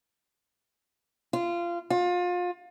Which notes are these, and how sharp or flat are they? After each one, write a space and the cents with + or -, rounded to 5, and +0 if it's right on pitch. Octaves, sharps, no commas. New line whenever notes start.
F4 -20
F4 +30